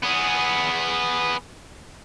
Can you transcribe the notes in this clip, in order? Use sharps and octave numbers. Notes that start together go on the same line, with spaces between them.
B3 G#4